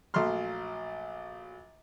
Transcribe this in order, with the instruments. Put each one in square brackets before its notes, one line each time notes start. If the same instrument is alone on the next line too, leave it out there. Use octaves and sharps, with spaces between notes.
[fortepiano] A#1 F#3 A3 C6 F6